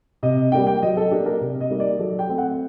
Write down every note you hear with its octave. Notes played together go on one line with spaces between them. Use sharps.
C3 D#5
G3 A#3 D4 G5
G5
F#3 D#5
A4
A#3 D4 G4
A#4
C3
D#5
G3 A#3 D#4
D5
F#3 A4
G5
A3 C4
F#5